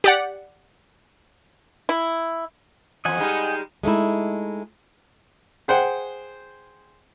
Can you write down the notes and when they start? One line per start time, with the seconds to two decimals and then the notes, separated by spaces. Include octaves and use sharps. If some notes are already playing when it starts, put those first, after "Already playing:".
0.04 G4 D5 F#5
1.89 E4
3.05 E2 F3 D#5 F#5 G#5
3.18 G3 G#3 D#4
3.83 G#3 A3 D#4 E4
5.68 G#4 C5 F#5 G5